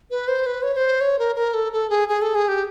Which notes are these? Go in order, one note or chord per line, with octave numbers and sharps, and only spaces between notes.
B4
C5
B4
C#5
C#5
C5
C#5
A#4
A#4
A4
A4
G#4
G#4
A4
G#4
G4